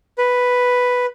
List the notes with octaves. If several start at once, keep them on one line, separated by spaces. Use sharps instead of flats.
B4